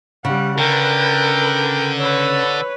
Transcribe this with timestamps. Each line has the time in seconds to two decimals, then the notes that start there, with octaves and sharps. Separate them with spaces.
0.25 C#3 G3 F#5
0.58 D3 A#4 B4 G5
1.99 B4 C#5 E6